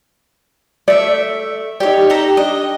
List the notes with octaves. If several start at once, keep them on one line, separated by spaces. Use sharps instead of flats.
A3 D5 E5
D#4 G4 C#5 D5
G4 A4 A#5
D4 D#5